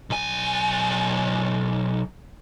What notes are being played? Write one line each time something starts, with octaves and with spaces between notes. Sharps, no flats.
B1 G#5